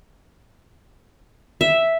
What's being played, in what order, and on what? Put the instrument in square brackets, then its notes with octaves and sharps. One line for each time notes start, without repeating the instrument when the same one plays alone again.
[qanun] E5